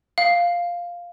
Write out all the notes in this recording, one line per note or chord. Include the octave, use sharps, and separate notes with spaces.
F5